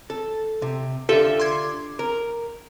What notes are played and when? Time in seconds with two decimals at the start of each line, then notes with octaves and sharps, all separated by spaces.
0.10 A4
0.62 C3
1.09 D3 F4 G4 A4 E5
1.40 C6 D6 G#6
1.99 A#4